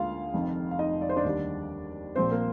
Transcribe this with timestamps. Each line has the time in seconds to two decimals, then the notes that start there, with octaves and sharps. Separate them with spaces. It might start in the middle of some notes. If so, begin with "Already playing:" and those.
Already playing: D2 D3 G#3 A#3 F4 F5
0.33 F1 F2 D#3
0.71 F5
0.79 D#4 D#5
1.01 D5
1.09 C5
1.17 D4 D5
1.25 D#2 D3 G3
2.15 A#1 A#2 F3 C4 C5
2.31 A#3 A#4